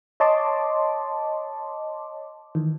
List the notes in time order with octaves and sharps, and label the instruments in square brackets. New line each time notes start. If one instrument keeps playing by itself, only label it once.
[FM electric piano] C#5 D#5 A5 C6 D6
D#3 E3